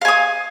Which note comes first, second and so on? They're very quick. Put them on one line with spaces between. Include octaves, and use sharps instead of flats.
F5 G#5 D#6